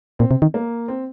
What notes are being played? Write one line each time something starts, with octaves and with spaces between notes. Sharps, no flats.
A#2 C4
C3
D#3
A#3
C4